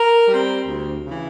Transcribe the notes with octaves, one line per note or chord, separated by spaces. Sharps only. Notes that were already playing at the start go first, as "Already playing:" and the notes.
Already playing: A#4
G3 C4
D2
C#3 E3